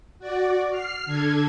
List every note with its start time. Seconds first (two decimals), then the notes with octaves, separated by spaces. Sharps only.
0.19 F#4 D5
0.70 F6 C7
1.06 D3 A4 G#6